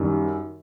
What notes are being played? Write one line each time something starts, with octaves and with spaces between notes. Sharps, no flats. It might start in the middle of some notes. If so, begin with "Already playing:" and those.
Already playing: F#2 D#3 G3